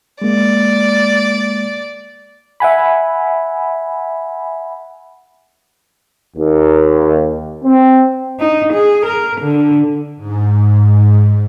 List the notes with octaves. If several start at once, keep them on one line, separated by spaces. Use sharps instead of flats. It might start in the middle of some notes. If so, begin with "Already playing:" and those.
G#3 A#3 D5
E5 F#5 G#5 B5
D#2
C4
D#4
G#4
A#4
D3
G#2